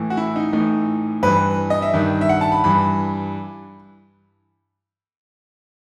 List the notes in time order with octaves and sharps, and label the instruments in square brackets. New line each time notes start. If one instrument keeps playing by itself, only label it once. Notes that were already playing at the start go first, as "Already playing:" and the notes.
Already playing: [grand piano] A2 E3
F#4
E4
D#4
A2 E3 D#4
G2 E3 B4
D#5
E5
G2 D#3
E5
F#5
A5
B5
G2 E3 B5